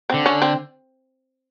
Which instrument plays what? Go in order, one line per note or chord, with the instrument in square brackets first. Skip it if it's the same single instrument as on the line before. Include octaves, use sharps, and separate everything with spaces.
[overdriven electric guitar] D3 [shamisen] C4
[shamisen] C#4
C4